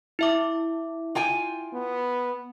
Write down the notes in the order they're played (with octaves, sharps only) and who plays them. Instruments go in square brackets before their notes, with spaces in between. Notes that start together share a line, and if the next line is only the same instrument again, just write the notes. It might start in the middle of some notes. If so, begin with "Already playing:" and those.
[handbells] E4 E5 D6
[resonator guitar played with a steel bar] F4 G5 G#5
[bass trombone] B3